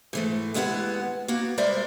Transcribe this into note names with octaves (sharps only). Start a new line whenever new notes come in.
G#2 E3 A3
D#2 G#3 B3 E4 F5 F#5
A#3 B3 F#4
G3 G#3 A#4 C5 D5 E5